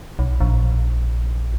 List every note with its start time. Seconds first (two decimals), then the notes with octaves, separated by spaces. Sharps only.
0.19 B1
0.40 A#1